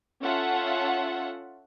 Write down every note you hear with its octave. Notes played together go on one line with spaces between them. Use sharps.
C#4 F4 A4 E5 F#5 A5